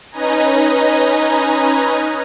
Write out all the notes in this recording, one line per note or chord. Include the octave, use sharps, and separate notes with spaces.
C#4 D#4 B4 D#5 G#5 A#5